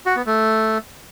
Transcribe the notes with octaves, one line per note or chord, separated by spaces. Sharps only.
F#4
B3
A3